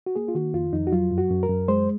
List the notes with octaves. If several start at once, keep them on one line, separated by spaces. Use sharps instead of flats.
F#4
A#3 G#4
F4
D#3 F#4
F2 F4
F2 D#4
F#4
F#3 F4
F#2
F#4
F#2
A#4
F#2
G#3 C5